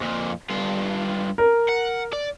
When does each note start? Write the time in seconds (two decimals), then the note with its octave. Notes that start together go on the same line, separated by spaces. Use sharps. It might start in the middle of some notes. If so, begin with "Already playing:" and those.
0.01 F2 A#2
0.50 G2 F4
1.38 A#4
1.69 F#5
2.13 D5